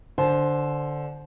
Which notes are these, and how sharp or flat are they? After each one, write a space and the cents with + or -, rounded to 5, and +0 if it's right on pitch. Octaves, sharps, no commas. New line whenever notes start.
D3 +0 C5 +0 A5 -45